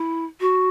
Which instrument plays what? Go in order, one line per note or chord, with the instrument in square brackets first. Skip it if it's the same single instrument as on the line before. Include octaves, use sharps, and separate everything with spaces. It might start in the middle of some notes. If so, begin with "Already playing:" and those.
Already playing: [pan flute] E4
F#4